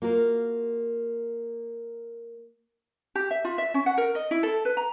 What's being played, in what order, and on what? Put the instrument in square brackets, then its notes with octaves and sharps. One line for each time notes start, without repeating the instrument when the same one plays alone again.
[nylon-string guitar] A#3 F4 F#4 A#4
[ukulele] G4
E5
F4
E5
C#4
F#5
A#4
D#5
E4
A4
B4
A#5